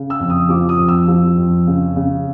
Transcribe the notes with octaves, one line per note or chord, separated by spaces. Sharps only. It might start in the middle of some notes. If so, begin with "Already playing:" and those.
Already playing: C#3
E6
F2
D#6
F3 D6
D#6
F2
E6
F3
F2
C#3
C#3